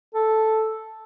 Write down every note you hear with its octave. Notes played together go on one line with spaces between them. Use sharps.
A4